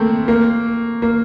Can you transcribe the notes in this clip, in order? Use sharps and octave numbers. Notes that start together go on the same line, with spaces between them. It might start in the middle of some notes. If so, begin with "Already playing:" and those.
Already playing: A3 A#3 C4
A#3
A#3